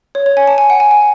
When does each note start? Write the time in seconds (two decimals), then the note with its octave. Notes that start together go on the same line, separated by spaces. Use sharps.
0.15 C#5
0.26 C#5
0.37 G#5
0.47 A5
0.58 G#5
0.70 F#5
0.80 G#5
0.91 G#5